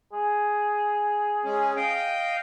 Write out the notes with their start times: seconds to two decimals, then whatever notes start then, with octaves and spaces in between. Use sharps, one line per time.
0.13 G#4
1.45 G#3 C#4
1.77 D#5 F5 G5